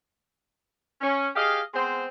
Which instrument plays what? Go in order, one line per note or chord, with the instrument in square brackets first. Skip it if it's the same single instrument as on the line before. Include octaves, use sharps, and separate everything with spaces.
[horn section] C#4
G4 G#4 D#5 F5
G#3 B3 C4 C5